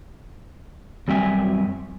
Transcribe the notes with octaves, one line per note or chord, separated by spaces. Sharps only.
F#2 G3 C4 E5 G#5